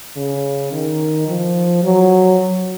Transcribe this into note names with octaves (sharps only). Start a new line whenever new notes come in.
C#3
D#3
F3
F#3